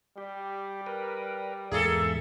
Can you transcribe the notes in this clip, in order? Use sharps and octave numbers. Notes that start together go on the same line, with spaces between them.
G3 G4
A#4 B4
E2 G#2 A#3 G#4 A4 E5